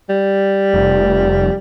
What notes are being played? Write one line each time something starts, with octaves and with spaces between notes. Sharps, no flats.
G3
F1